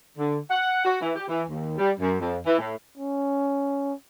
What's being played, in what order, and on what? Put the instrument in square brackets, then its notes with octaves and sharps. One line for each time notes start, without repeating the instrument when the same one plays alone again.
[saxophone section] D3
F#5
F#4
E3
G4
E3
D#2
G3
F#2
F2
E3
A2
[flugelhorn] C#4